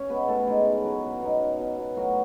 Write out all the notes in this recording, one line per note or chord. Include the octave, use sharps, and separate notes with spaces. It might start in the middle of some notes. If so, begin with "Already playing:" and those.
Already playing: C#4 C#5
G#3 B3 B4
A2 A3 A4
G#3 D#4 G#4
A2
A2 F#3 F#4
B3
B2 D#4
C#4
B2
B2
A2 F#3 F#4